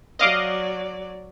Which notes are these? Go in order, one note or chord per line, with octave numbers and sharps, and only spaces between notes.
F#3 D5 D#5 F5 D6